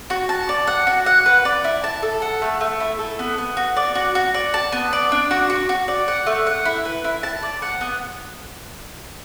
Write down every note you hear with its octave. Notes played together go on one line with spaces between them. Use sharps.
F#4
A5
D5
F#5
F#4
F#5
B4
D5
E4
A5
A4
F#5
A3
A3
E4
A4
B3
B3
F#4
D5
F#4
F#4
D5
A5
B3
D5
D4
F#4
F#4
F#4
D5
F#5
A3
F#5
E4
B4
E4
A5
D5
F#5
B3